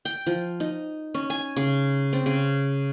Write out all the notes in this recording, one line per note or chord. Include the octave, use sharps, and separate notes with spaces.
G5
F3
D#4
C#4
G#5
C#3
C4
C#3